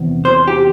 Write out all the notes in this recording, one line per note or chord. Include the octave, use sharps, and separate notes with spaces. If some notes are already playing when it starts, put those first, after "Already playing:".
Already playing: E2 C3
C5
G4